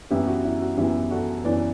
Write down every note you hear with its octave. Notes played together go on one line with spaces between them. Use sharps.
F#2 E3 B3 E4 G4
F#4
E4
F#4
F#2 E3 B3 E4 G4
F#4 A4
F#2 E3 B3 B4 D5